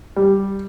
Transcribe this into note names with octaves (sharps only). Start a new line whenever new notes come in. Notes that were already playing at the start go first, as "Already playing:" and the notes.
G3